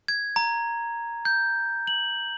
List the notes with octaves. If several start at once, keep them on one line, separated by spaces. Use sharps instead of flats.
G#6
A#5
G6
F#7